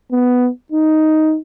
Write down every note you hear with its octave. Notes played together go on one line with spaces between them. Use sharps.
B3
D#4